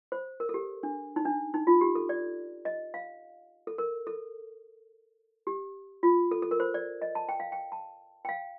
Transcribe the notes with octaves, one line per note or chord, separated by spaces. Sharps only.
C5
A#4
A4
G4
D4
D#4
D4
D#4
F4
G4
A4
D5
D#5
F5
A4
A#4
A4
G4
F4
A4
A4
A#4
C5
D5
D#5
A5
G5
F5
G5
A5
G5
F5